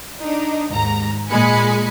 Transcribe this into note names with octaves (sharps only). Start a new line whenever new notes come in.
D4 D#4
D#2 G#2 A#5
A#2 G#3 G#5 B5 C#7